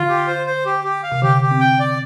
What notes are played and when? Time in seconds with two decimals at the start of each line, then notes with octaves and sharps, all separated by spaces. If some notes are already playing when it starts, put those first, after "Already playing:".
Already playing: D3 F4
0.09 G4
0.27 C5
0.46 C5
0.65 G4
0.84 G4
1.03 F5
1.12 C3
1.22 D3 G4
1.41 G4
1.51 C4
1.60 G5
1.79 D5